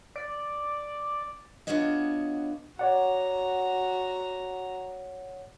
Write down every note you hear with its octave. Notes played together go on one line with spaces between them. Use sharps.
D5
B3 D4 F4 F#4 C#5 D#5
F#4 C#5 D5 F#5 A#5